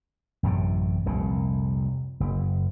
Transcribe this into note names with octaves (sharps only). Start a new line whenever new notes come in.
A1 F#2 A2 C3
F1 C2 A#2
F#1